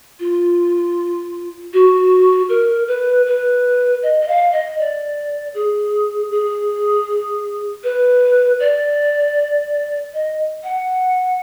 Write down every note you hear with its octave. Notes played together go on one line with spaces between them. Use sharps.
F4
F#4
A#4
B4
B4
D#5
D#5
F5
D#5
D5
G#4
G#4
B4
D5
D#5
F#5